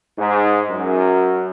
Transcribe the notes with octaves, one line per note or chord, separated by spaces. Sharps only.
G#2
F#2